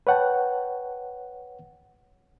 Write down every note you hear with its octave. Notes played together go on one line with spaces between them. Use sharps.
B4 C#5 F#5 G5 A5